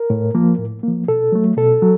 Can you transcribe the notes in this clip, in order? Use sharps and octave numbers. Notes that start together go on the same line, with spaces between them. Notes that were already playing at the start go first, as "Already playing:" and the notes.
Already playing: A#4
A2
F3 A#3
A2
F3 A#3
B2 A4
F#3 A3
B2 A4
F#3